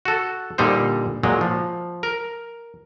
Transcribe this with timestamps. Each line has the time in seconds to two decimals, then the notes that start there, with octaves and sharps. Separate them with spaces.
0.05 F#4 A4
0.58 A#2 D3 G3 D#4 C5
1.23 A#2 F#3 G#3
1.41 F3
2.03 A#4